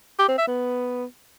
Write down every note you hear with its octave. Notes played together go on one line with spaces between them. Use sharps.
G4
C4
E5
B3